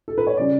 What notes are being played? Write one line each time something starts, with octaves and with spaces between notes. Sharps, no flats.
A4
B4
C#5
C#3 G3 D5